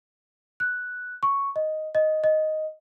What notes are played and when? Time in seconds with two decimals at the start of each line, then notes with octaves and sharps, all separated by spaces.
0.60 F#6
1.23 C#6
1.56 D#5
1.95 D#5
2.24 D#5